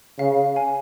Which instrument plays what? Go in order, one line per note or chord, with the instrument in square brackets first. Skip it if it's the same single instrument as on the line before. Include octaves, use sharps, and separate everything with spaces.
[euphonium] C#3 [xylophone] F5
[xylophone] F5
G#5